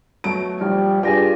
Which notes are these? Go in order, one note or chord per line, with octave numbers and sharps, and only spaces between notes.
B2 F#3 A3 D7
A#1 G3 F6
G2 F4 G4 G#4 D5 G5 G#5 A#6